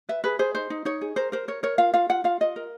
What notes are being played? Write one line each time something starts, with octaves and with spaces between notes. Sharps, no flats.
B4 E5
G#4 B4
G#4 C5
D#4 C5
D#4
D#4 C#5
G#4
A#4 C5
A#4 C5
A#4 C#5
A#4 C#5
F4 F5
F4 F5
F4 F#5
F4 F5
F4 D#5
A#4